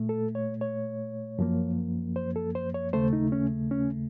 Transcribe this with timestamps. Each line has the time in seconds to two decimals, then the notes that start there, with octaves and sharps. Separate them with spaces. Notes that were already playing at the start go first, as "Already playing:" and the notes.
Already playing: A#2 A3
0.09 A4
0.35 C#5
0.61 C#5
1.39 F#2 F3 A#3
2.16 C5
2.36 A4
2.55 C5
2.74 C#5
2.93 D#2 C#3 A3 C5
3.13 D#4
3.32 C#4
3.71 C#4